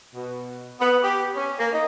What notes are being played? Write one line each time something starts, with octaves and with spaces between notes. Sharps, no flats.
B2
B3
G4
C#4
A#3
D#4